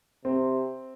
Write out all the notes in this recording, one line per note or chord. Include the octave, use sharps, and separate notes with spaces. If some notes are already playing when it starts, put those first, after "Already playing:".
C3 C4